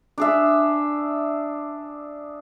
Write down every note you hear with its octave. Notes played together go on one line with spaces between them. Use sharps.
D4 G#4 E5